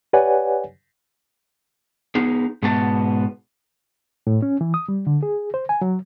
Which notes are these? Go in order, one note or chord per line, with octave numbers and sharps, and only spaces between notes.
G4 B4 C#5 D5 F#5 G#5
B3 D#4 G#4
G#2 B2 B3 A5
A2
C#4
E3
D#6
G3
D3
G#4
C5
G#5
F#3